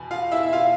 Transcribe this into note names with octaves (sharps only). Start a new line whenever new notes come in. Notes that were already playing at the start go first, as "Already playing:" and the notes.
Already playing: E2 B2
F4 F5
E4 E5
F4 F5